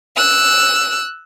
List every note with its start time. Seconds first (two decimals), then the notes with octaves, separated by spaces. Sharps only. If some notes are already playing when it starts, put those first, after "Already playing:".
0.16 E6 F#6